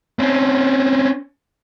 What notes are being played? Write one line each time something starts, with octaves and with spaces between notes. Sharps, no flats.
C4 C#4